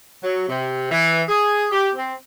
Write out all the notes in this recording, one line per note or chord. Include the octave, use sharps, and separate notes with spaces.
F#3
C3
E3
G#4
G4
C4